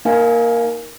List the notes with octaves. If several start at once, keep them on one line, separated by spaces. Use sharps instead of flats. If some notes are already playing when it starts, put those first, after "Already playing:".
A#3 D#4 A#4 F5 G#5